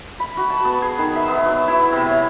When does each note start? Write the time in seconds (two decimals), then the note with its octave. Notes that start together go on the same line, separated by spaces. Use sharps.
0.20 B5
0.37 F#4
0.50 A5
0.65 B3
0.82 G#4
0.99 D#3
1.15 E5
1.28 B3
1.46 F#3
1.68 E4
1.92 C3
2.09 C#5